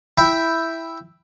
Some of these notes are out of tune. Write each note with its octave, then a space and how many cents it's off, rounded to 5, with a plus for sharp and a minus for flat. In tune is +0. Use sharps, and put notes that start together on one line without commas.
E4 +0 G5 +0 B5 +0